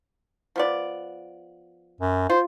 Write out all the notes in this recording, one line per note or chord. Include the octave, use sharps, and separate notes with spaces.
F3 B3 D5
F#2
F4 C5